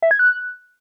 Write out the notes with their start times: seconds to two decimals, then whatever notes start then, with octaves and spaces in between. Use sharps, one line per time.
0.02 E5
0.11 G#6
0.19 F#6